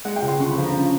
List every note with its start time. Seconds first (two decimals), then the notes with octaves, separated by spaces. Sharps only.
0.05 G#3 F#5
0.16 G5
0.22 C#2
0.28 C6
0.40 D3 C#6
0.51 B5
0.57 F3
0.63 A#5
0.74 C#3